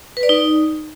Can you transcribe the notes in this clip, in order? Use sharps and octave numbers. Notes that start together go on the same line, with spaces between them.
B4
D5
D#4